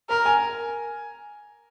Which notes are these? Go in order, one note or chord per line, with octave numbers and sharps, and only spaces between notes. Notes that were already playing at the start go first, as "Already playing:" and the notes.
A#4 A#5
G#5